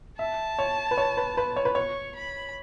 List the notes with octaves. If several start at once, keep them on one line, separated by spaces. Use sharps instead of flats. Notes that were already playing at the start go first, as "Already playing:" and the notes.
E5 A5
C#5
B4
C#5
B4
B4
C#5
B4
C#5 C#6
B5